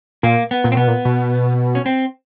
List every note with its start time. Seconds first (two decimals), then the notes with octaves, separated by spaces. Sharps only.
0.23 A#2 A#3
0.51 B3
0.64 A#2
0.72 C4
0.76 B2 B3
0.88 A#2
1.05 B2
1.75 C#4
1.86 C4